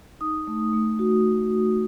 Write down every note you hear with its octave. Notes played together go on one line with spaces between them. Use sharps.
D#4 D#6
A3
A3
F#4